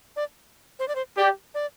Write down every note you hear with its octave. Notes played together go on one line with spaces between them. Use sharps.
D5
C5
D5
C5
G4 D5
D5